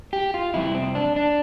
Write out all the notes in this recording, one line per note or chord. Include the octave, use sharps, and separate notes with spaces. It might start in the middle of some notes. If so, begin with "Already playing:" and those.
G4
F4
F2 C3 G3 E4
C4
D4
D4